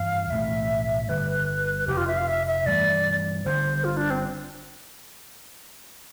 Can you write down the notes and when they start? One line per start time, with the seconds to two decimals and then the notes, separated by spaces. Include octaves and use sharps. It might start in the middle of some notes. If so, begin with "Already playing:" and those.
Already playing: G2 E3 B3 F5
0.30 B1 A2 E3 A3 E5
1.09 G1 G2 D3 B4
1.88 F1 F2 C3 G4
1.97 F4
2.08 E5
2.17 F5
2.27 E5
2.47 E5
2.66 G2 E3 A3 D5
3.45 G1 G2 D3 C5
3.84 F4
3.97 D4
4.10 C4